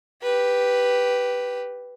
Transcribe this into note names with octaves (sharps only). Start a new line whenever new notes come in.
G4 B4